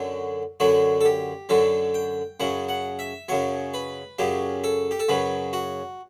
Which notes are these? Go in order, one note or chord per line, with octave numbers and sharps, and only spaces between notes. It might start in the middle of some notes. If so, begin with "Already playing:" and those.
Already playing: F#2 D3 F#3
F#2 D3 F#3 F#4
A4
G4
F#2 D3 F#3 A4
G5
F#2 C#3 F#3 F#5
F#5
E5
F#2 C#3 F#3 C#5
B4
F#2 C#3 F#3 G4
A4
G4
A4
F#2 C#3 F#3 B4
F#4